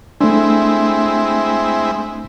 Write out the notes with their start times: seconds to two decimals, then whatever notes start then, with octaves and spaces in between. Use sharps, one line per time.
0.21 G#3 A3 C4 D4 E4